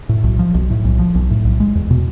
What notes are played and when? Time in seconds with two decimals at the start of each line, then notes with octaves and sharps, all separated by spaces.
0.09 A2
0.24 B1
0.39 F3
0.54 B1
0.70 A2
0.85 B1
0.99 F3
1.15 B1
1.31 A2
1.45 B1
1.60 G#3
1.75 E2
1.90 B2